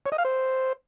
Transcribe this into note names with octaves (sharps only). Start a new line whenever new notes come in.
C#5
D#5
F5
C5